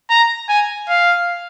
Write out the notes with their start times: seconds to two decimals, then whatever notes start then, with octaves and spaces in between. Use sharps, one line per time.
0.10 A#5
0.49 G#5
0.89 F5